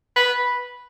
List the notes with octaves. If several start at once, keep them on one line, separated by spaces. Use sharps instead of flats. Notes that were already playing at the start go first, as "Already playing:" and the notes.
B4